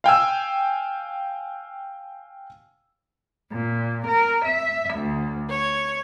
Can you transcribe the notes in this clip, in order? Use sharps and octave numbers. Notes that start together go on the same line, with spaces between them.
F5 G5 G#5 E6
A#2
A#4
E5
D2
C#5